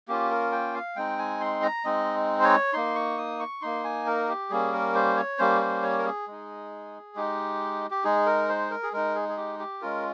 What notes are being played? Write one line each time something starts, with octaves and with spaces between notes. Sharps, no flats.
A#3 C#4 F4 G4
A#4
G5
F5
G#3 C4 D#4 G5
G#5
C6
A#5
G#3 C4 D#4 D#5
C5
C#5
A#3 D#4 C6
C#6
D#6
C#6
A#3 D#4 C6
G#5
A#4
G4
G3 A#3 C#4 G#4
A#4
C5
C#5
G3 A#3 C#4 C5
C5
C#5
A#4
G#4
G#3 D#4
G#3 D#4 G4
G4
G#3 D#4 G#4
A#4
C5
A#4
G#4
G#3 D#4 A#4
G#4
G#4
G4
G4
G#3 C#4 F4 A#4